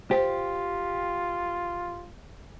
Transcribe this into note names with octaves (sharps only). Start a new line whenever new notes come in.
F4 G4 C5